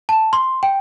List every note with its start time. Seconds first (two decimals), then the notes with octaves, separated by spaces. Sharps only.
0.09 A5
0.33 C6
0.63 G5